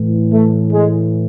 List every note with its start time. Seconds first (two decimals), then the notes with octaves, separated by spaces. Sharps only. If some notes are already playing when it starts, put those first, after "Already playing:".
Already playing: A2 E3
0.32 A3
0.72 G#3